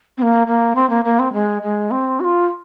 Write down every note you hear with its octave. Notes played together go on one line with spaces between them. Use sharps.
C4
A#3
A#3
C4
A#3
A#3
C4
G#3
G#3
C4
F#4
F4